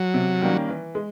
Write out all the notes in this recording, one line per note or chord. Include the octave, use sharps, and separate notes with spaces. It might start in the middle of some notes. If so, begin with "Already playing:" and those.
Already playing: F#3
C3
D#3 G3 A#3 C#4
E3
G#3